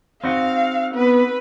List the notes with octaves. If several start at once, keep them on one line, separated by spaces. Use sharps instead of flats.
C4 D#4 F#4 F5
B3 B4